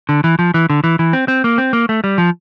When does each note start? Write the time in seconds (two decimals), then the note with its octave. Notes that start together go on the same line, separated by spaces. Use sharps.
0.09 D3
0.24 E3
0.39 F3
0.54 E3
0.70 D3
0.84 E3
0.99 E3
1.13 C4
1.28 C4
1.44 A#3
1.58 C4
1.73 A#3
1.89 A3
2.04 G3
2.18 F3